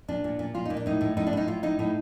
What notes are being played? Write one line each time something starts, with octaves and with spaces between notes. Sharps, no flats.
A#2 D4
A#2
A#2
A#2 F4
A#2 D#4
D4
A2 D#4
A2
A2 D#4
D4
A2 D#4
A2 F4
A2 D#4
A2 D#4